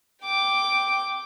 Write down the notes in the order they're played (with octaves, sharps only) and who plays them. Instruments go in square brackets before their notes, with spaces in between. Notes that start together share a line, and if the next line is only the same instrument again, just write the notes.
[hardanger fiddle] G5 D6